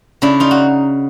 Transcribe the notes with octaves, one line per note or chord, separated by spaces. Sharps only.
C#3 D4 E4
D#4 F4
F#4